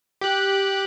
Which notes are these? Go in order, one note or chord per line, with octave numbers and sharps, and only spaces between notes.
G4 F#6